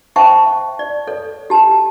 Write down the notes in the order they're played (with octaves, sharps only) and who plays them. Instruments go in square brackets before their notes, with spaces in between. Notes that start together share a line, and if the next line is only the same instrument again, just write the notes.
[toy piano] C5 E5 G5 A5 C#6
D5
A4 C#5
G4 A5